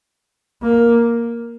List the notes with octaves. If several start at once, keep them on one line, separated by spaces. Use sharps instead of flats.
A#3